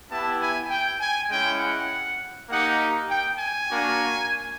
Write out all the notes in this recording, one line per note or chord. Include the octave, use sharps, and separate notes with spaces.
B3 E4 G4 A5
G#5
G5
G#5
G#3 C#4 E4 G5
F#5
A#3 D#4 G4 F#5
G5
G#5
A#3 D4 F#4